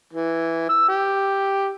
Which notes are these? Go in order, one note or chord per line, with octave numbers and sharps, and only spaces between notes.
E3
E6
G4